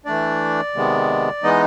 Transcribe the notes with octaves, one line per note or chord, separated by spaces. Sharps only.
E3 A3 D4 D5
C3 D#3 G#3 B3
E3 G#3 B3 D#4 D#5